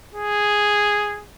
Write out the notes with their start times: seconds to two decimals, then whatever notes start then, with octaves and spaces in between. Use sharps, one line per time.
0.15 G#4